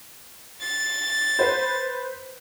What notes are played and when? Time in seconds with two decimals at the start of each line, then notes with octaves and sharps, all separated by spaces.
0.61 A6
1.39 B4 C5